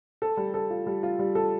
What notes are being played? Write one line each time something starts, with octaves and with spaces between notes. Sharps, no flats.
A4
G3
A4
F4
G3
F4
G3
A4